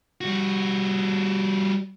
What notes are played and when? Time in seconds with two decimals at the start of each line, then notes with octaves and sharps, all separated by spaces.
0.21 G3 F#4